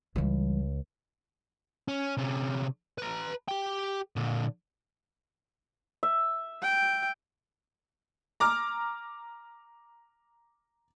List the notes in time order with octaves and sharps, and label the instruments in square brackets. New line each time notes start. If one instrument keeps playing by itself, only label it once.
[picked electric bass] C#2 [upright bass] E3 G3
[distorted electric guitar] C#4
C3 C#4
B4 A#5
G4 G5
A#2 D3
[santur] E5
[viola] G5
[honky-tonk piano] A#5 D6 F6